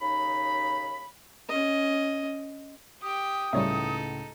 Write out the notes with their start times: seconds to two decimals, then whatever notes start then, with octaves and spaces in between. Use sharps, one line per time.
0.02 D#2 C#3 D#4 B5
1.49 C#4 D#5
3.02 G4 G5 D#6
3.53 C#2 A2 G3 D#4 A4 C#5 E5